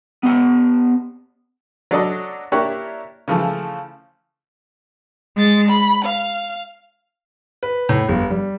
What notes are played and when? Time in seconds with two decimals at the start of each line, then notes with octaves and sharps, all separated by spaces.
0.23 B3 G4 G5
1.91 F#3 D4 A4 D5 D#5
2.52 A#3 D4 E4 G4 C#5 F#6
3.28 C#3 E3 F3 A3
5.35 G#3 A6
5.68 B5
6.04 F5
7.63 B4
7.89 A2
8.09 G1
8.30 G3